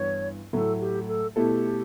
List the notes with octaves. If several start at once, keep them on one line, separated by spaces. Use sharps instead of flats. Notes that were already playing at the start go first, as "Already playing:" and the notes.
Already playing: G2 E3 B3 D4 C#5
A2 F#3 A3 A4
G4
A4
B2 A3 E4 G4 A4